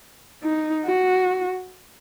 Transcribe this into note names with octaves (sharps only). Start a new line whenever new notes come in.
D#4
F#4